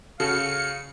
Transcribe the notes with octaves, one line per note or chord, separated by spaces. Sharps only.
C#3 F#4 A4 F5 C#7